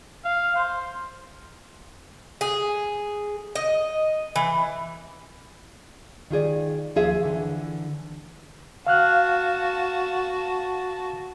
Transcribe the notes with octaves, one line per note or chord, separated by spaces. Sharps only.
F5
C5
G#4
D#5
E3
D#3 F4 G#4 D5
D#2 F3 F4 G#4 E5 F5
D3 E3
F#4 F5 A5 F6 F#6